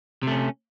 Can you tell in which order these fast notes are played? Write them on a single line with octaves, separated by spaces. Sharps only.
C3 A3 C#4